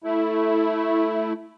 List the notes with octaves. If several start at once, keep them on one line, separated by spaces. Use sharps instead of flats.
A3 E4